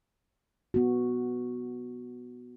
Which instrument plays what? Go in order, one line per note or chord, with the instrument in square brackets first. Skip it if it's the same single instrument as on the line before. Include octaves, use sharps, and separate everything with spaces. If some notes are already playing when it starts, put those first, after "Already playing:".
[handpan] B3 F#4